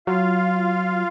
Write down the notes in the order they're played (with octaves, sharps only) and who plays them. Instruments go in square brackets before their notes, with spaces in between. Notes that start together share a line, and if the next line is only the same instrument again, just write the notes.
[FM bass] F#3 [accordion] F4 F5